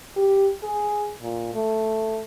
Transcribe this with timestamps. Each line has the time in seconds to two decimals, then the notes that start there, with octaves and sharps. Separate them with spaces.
0.17 G4
0.63 G#4
1.21 A#2
1.54 A3